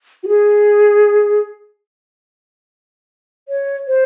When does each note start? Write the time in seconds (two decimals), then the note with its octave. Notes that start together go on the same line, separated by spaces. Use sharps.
0.23 F#4
0.28 G#4
3.48 C#5
3.88 C5